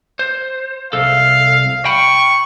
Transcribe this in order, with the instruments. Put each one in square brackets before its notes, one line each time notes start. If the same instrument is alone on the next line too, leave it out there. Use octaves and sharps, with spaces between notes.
[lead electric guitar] C5
[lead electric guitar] C2 A4 [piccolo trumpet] F5
[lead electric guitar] G5 B5 [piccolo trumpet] C#6